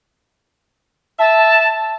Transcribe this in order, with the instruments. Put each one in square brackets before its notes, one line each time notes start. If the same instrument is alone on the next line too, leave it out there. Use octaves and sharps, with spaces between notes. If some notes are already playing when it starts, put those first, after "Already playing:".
[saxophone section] E5 [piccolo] A5